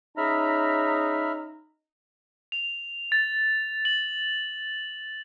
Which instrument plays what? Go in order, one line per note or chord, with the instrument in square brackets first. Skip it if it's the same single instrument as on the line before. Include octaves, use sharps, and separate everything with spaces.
[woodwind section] C#4 G#4 A#5 [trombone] D#4 [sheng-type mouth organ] E5 B5 F6
[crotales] F7
A6
F#7